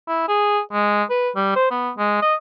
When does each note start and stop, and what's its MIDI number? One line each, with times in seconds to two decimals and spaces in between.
0.07 0.27 64
0.28 0.59 68
0.72 1.03 56
1.10 1.29 71
1.35 1.51 55
1.56 1.67 72
1.71 1.91 59
1.97 2.21 56
2.22 2.35 75